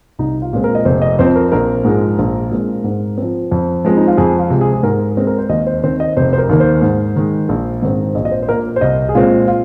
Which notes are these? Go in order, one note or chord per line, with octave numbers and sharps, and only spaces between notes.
C2 D#4
F4
A#2 G#3 C4
A#4
D#5
F1 C5
D#5
F2 F3 C4 C5
A#4
A#1 A#4
G#2 F3 G#3
A#1
A#2 G#3 C4
G#2
F3 C4
F2
F3 G#3 C4
D#4
F4
F2 G#4
F4
C3 G#3
G#4
G#4
G#2 A#4
G#3 C4
A#4
C5
D#2 D#5
C5
D#3 C4 C5
D#5
F1 C5
C5
A#4
D#2 D#3 A#3
C5
G#2
D#3 G#3
A#1
G#2 D#3 C4
A#1 D#5
D#5
C5
C5
A#2 A#3 A#4
C5
C2 D#5
G#4
A#2 G#3 C4 F4
F4